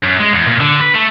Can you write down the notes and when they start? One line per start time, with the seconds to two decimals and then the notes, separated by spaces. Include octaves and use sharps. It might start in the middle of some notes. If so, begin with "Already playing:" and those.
0.03 F#2
0.20 G#3
0.33 E2
0.48 A#2
0.61 D3
0.81 B4
0.95 A3